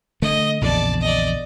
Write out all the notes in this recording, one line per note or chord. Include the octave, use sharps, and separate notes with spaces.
D3 A3 D#5
A#1 E2 C#3 D5 A5
D5 D#5